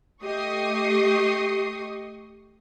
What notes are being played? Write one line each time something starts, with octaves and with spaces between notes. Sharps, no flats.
A3 G4 D#5 C#6 D#6 C7